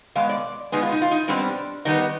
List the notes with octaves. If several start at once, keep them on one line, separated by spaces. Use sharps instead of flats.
B2 G#3 F5
D5
B2 G#3 B3 D#4
F4
D#4
F4
D#4
B2 G3 C4 D4
D#3 G3 B3 D#4